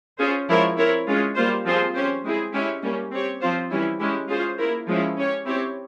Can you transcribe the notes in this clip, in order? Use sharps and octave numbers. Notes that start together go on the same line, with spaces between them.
C#4 F4 G#4 C5
F3 G#3 E4 A#4 C#5
C4 E4 A#4 C#5
G#3 C#4 F4 G#4
G3 A#3 F4 C5
F3 C4 F4 G#4 C5
C#4 G4 C5
G#3 C4 E4 G#4
G#3 C#4 E4 G4
G3 A#3 C#4
C4 G4 C#5
F3 C4 F4 C5
E3 G3 C#4 E4
G#3 C#4 E4 G4
C#4 F4 G#4 C5
A#3 E4 A#4
F3 G#3 C#4 E4
C#4 G4 C#5
C4 E4 G4 C#5